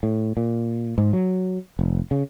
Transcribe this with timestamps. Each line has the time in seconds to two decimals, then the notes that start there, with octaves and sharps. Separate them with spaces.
0.03 A2
0.37 A#2
0.98 G#2
1.13 F#3
1.79 F1
2.11 C#3